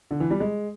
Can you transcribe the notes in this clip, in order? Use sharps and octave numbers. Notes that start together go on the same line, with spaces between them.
D3
E3
G3
G#3